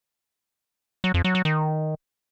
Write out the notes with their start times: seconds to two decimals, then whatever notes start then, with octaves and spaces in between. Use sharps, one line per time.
1.04 F#3
1.14 F2
1.24 F#3
1.35 F#3
1.45 D#3